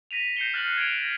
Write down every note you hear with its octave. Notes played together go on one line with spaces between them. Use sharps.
A#6 B6 D#7 F7
G6 A#6 C7 C#7 E7 G7
F6 F#6 A6 F#7
G#6 D7 F7
A#6